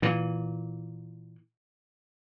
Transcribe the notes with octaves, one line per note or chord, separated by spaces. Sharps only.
A#2 E3